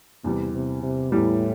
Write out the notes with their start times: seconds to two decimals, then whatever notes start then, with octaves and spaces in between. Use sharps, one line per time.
0.24 E2 C3 E3 G3
0.54 C3
0.83 C3
1.12 E2 A2 E3 G3